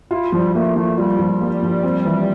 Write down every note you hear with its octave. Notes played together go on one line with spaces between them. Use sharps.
E4 F4
F3 G3
A3 A#3
F3 A3
G3 F4
F3
G3 A#3
F3
C4
E3